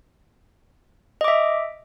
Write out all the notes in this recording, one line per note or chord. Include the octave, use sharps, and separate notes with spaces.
D#5 E5 D6